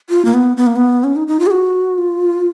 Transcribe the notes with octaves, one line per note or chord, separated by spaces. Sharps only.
F4
A#3
B3
B3
A#3
B3
C#4
D#4
D#4
F4
G#4
F#4
F4